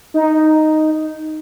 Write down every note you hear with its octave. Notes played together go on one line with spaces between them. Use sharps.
D#4